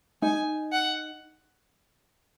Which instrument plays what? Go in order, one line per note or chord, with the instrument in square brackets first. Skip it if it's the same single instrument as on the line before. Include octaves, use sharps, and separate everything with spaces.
[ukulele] D#4 [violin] G#5
[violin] F#5